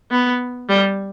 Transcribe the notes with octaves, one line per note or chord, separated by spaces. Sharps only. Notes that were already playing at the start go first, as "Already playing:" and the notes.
B3
G3